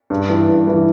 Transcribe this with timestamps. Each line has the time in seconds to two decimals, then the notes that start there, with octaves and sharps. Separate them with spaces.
0.10 G2
0.29 E3
0.49 G2
0.67 E3